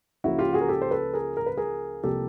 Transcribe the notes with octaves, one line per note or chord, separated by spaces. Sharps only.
C#2 C#3 F3 A#3 E4 F#4
F4 G4
F#4 G#4
A#4
G4 A4
C5
A4 B4
G#4 A#4
A#4
B4
G#4 A#4
C2 C3 F3 A#3 G4 A4